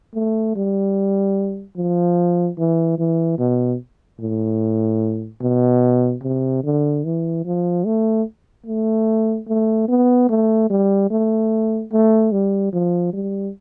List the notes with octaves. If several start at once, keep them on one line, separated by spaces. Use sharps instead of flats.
A3
G3
F3
E3
E3
B2
A2
B2
C3
D3
E3
F3
A3
A3
A3
B3
A3
G3
A3
A3
G3
F3
G3